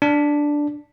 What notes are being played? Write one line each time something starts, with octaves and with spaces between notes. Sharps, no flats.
D4